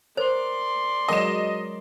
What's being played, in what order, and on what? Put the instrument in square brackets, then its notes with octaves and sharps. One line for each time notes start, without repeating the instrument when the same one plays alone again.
[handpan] A#4 [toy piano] C5 [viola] D5 C6
[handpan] F#3 G#3 A#4 [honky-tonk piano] D#5 E7